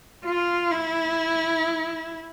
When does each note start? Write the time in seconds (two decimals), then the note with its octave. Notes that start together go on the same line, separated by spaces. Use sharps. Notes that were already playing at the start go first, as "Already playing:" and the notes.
0.25 F4
0.71 E4